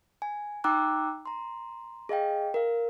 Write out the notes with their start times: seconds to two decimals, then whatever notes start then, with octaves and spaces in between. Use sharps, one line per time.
0.22 G#5
0.64 D#4 G5 A#5 D6 E6 F#6
1.26 A#5 C6
2.09 G#4 D#5 F5 G5
2.54 A#4 F5